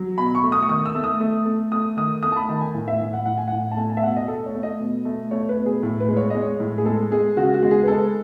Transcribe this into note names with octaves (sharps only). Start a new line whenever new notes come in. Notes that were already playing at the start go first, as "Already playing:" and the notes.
Already playing: F#3
B2 B5
C#6
A3
D#6
C#6
D#3 D#6
E6
A3
D#6
A3
A3
A3 D#6
D#3 D#6
A3 D#6
A5
B5
D#3 A5
G#5
A2
E5
A2
F#5
A2 F#5
G#5
A2 F#5
A5
A3 G#5
A5
E5
B2 F#5
D#5
A3 A4
C#5
A3
D#5
B2
A3
A3 C#5
B4
B2
G#4
A2
B4
G#3
C#5
G#3 D#5
C#5
A2
G#4
G#3 A4
G#3 G#4
C#3 F#4
F#4
G#3
G#4
B4
G#3 A4